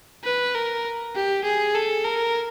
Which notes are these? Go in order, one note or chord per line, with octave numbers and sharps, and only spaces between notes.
B4
A#4
G4
G#4
A4
A#4